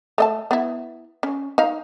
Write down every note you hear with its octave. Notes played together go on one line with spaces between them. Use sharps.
A3 D#5 A5
B3 E4
C#4
D#4 F5